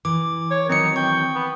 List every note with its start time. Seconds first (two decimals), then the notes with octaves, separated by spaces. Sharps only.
0.05 E3 D6
0.51 C#5
0.69 D#3 E3 F#3 C4 D#4 C#7
0.96 G5 C#6
1.35 B3